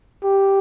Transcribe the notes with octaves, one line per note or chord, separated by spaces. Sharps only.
G4